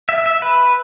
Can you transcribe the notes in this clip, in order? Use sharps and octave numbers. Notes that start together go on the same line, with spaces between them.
E5
E5
B4